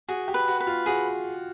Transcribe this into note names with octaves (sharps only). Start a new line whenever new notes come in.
F#4 G#4
G4
B4
F#4
B4
F4
F#4 G#4